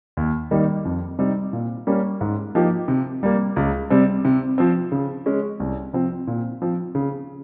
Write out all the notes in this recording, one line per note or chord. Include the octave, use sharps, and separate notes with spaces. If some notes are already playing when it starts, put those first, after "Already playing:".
D#2
D#3 G3 A#3 D#4
F2
C3 G3 C4 D#4
A#2
G3 A#3 C#4
G#2
F3 A#3 D#4 G4
C3
G3 A#3
C#2
C3 G3 C4
C3
F3 C4
C#3
G#3 C#4
C2
C3 F3 C4
A#2
F3 C4
C#3